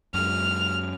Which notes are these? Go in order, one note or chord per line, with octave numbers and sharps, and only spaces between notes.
F#2 G#3 F6